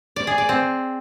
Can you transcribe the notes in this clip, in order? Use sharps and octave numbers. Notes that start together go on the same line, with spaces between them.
D5
G#4
D5
C4